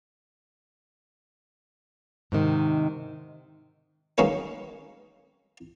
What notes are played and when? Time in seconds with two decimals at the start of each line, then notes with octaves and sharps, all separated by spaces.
2.32 G#2 C3 D#3
4.18 D#3 G#3 A#3 C#4 F#4 B4